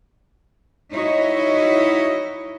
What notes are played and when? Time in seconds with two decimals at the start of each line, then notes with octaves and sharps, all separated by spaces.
0.92 D#4 E4 F#4 C#5 D#5